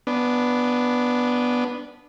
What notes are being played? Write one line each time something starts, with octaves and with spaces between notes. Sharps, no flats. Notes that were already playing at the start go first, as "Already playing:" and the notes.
B3 D4